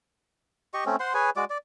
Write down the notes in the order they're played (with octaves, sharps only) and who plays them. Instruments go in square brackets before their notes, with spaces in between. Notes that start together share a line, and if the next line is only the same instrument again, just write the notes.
[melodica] G4 D#5 C#6
A3 C4 C#4
C5 F#5 C6
G#4 B4 C#5 G#5
G#3 F#4 D5 D6
D5